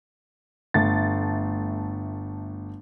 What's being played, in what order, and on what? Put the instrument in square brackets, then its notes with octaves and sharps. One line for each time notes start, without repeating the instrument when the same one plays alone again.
[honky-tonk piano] G1 A3 A6